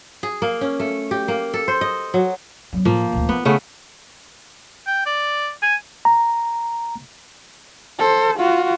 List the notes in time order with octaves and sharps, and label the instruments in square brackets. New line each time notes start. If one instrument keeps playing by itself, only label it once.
[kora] G#4
A#3
C#4
A3
G4
A#3
A4
C5
D#5
F#3
[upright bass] F#3 B3
[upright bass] A2 [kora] F3 A#3
[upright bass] D#1 D2
[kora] B3 [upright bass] D#4
[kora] C#3 A3 B3
[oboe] G5
D5
G#5
[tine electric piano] A#5
[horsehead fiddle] A4 C5
F4 F#4